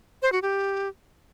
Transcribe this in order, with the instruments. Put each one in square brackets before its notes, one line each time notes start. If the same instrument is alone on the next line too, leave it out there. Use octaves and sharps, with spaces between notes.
[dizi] C5
F#4
G4